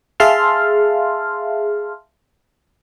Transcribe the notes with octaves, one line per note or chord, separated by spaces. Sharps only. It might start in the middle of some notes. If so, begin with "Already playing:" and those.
G#4 E5 F5 A5 C6 F6